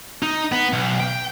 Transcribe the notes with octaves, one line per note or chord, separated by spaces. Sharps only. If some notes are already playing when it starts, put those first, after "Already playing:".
D#4
B3
B1
G5